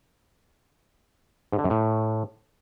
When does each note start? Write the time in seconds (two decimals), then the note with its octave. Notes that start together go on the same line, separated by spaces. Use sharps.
1.53 G#2
1.58 D3
1.64 F#2
1.70 A2